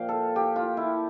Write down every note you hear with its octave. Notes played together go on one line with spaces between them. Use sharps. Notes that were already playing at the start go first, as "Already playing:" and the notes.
Already playing: A#2 F3 F5 G5
A4
G4
F4
E4